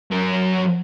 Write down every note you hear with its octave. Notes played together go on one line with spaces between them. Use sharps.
F#2 A#4